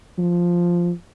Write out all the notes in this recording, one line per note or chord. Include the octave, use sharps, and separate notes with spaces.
F3